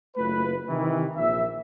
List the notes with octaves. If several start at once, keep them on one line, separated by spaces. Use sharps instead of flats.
F#1 A3 F4 B4
C3 D#3 E3
A#1 E5